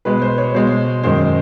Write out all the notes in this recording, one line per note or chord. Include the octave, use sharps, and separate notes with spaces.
B2 G#3 B4
C5
C#5
B2 G#3 C5
F#2 D#3 G#3 C5